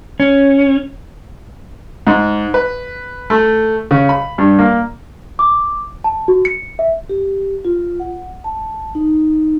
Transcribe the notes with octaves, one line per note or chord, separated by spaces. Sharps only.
C#4
G#2
B4
A3
C#3
B5
G2
A#3
D6
A5
F#4
C#7
E5
G4
F4
F#5
A5
D#4